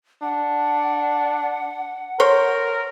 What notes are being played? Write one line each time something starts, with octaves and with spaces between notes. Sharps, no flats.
D4 F#5
A#4 C5 C#5